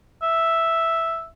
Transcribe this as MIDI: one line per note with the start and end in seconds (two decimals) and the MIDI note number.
0.22 1.26 76